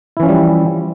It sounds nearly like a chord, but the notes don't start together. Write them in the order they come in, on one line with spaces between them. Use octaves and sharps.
E4 E3 C#4 F3 G3